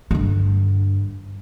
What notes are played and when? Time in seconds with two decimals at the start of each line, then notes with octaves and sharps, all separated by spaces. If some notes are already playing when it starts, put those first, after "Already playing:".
0.11 G2 D3